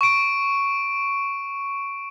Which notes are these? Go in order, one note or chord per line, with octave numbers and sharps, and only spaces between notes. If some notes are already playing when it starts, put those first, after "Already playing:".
C#6 D7